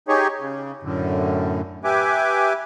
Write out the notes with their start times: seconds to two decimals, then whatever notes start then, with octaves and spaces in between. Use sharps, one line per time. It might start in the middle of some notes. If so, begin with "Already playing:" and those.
0.08 D#4 G4 G#4 C#5
0.40 C#3
0.83 F#2 A2 D3
1.84 G4 B4 E5 G#5 D6